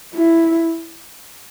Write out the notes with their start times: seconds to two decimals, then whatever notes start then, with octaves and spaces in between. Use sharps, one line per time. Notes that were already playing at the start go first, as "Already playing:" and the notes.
0.15 E4